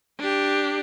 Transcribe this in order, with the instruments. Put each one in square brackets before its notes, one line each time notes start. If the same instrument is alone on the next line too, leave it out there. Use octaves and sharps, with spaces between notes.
[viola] D4 G4